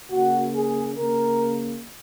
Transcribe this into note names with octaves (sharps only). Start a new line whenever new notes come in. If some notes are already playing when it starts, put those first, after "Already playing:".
C#3 A#3 F#4
G#4
C#3 A#3 A#4